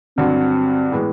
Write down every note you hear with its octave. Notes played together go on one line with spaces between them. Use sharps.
G2 D3 F#3 C4
A2 E3 G#3 B3